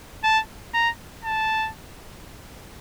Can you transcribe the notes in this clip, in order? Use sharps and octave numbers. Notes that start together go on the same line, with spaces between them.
A5
A#5
A5